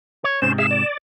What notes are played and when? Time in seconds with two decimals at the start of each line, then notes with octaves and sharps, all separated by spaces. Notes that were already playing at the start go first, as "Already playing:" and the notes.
0.24 C#5
0.42 G#2 C3 C#4 C5 E7
0.58 G#4 E5 F5 E7
0.71 D5